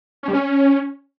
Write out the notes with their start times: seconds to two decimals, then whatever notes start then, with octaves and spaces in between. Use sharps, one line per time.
0.23 C#4
0.28 G3
0.33 C#4